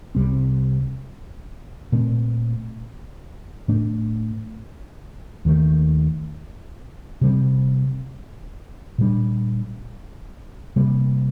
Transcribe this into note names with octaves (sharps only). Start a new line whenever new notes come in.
C2 C3 G3 C4
A#2 A3 C4
A2 A3 D4
D#2 D#3 A3
C3 G3 C4
A#2 G3 D4
C3 G3 A#3